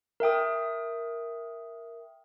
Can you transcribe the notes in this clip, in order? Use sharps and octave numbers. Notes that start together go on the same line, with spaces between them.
A#4 E5 G5 D#6